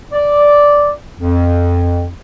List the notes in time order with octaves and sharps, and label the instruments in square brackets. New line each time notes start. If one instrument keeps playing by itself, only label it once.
[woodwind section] D5
F2